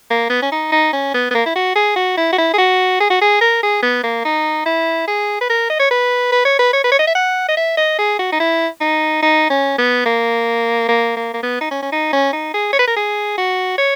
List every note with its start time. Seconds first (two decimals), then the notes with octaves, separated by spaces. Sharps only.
0.10 A#3
0.30 B3
0.42 C#4
0.52 D#4
0.72 D#4
0.93 C#4
1.14 B3
1.31 B3
1.35 A#3
1.46 E4
1.55 F#4
1.76 G#4
1.96 F#4
2.17 E4
2.32 F#4
2.38 E4
2.53 G#4
2.58 F#4
3.00 G#4
3.10 F#4
3.21 G#4
3.41 A#4
3.63 G#4
3.83 B3
4.04 A#3
4.25 D#4
4.66 E4
5.08 G#4
5.41 B4
5.50 A#4
5.70 D#5
5.80 C#5
5.91 B4
6.32 B4
6.45 C#5
6.59 B4
6.73 C#5
6.84 B4
6.92 C#5
6.99 D#5
7.07 E5
7.15 F#5
7.48 D#5
7.57 E5
7.77 D#5
7.99 G#4
8.19 F#4
8.32 D#4
8.40 E4
8.81 D#4
9.23 D#4
9.50 C#4
9.78 B3
10.06 A#3
10.89 A#3
11.16 A#3
11.34 A#3
11.43 B3
11.61 D#4
11.71 C#4
11.83 C#4
11.92 D#4
12.13 C#4
12.33 D#4
12.54 G#4
12.73 C#5
12.79 B4
12.87 A#4
12.96 G#4
13.38 F#4
13.78 C#5